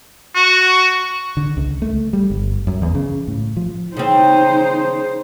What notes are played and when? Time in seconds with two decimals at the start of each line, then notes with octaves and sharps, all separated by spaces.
0.35 F#4
1.37 D3
1.57 C#2
1.82 A3
2.13 G3
2.30 G1
2.67 F#2
2.82 E2
2.95 C#3
3.28 A2
3.57 F3
3.97 C#3 C4 D#4 C5